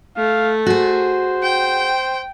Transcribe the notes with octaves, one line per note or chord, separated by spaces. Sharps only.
A3 F5
F#4 G#4 C5
G5